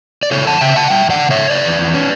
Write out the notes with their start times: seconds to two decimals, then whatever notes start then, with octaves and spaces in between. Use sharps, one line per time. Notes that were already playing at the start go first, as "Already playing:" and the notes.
0.23 D5
0.31 C#3 A4 C#5
0.46 E2 F#5 A5
0.61 C#3 E5 G5
0.76 C#3 F#5 A5
0.90 G3 E5 G5
1.05 E2 D5 F#5
1.20 C#3
1.31 C#3 C#5 E5
1.50 C#3 B4 D5
1.65 E2
1.79 E2
1.94 C#4